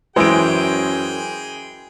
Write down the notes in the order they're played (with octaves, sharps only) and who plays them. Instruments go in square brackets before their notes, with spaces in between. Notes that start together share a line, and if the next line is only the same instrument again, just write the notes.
[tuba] F#2 [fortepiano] E3 G#3 [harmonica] G#4 G5 [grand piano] C5 D7